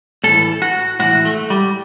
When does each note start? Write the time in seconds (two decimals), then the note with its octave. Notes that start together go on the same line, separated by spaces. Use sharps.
0.24 A2 E3 A4
0.62 F#4
0.99 A2 E3 F#4
1.25 A3
1.50 G3